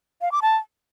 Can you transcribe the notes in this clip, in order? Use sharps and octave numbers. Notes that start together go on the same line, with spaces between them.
F5
D6
A5